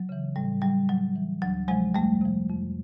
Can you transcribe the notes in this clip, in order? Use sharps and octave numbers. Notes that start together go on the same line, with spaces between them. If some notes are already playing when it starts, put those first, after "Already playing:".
Already playing: F#3
C#3 E3
A2 G3
F#3 G3
A2 F#3
E3
D2 F#3
C3 F3 F#3 G#3
F2 G3 A3
C3 F3
F2